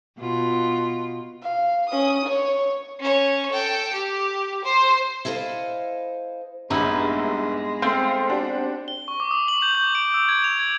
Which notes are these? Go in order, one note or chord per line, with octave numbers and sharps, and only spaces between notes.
B2 F4
F5
C#4 D#6
C#5
C#4 C#5
A4 G5
G4
C5 C6
E4 A4 C5 D#5 F5
A#1 G2 G#3 B3 D#4 E4
A3 C4 C5 F5
D4 F#4 G4
G7
C#6
D6
D#6
F#7
G6
G6
D7
E6
G#6
F7
G#6